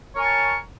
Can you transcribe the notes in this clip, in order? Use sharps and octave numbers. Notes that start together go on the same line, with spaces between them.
A#4 C#5 G#5 A5 C#6